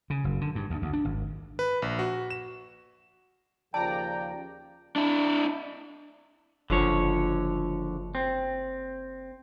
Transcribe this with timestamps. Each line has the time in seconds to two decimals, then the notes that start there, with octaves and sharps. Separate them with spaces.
0.10 C#3
0.24 F#1
0.41 D3
0.55 G2
0.70 D2
0.82 D2
0.93 D4
1.05 G#1
1.59 B4
1.82 A#1
1.99 F#4
2.31 E7
3.74 D#2 C#3 F3 D5 G5 A5 A#5
4.96 D4 E4
6.70 F#1 D3 F3 C#5
8.15 C4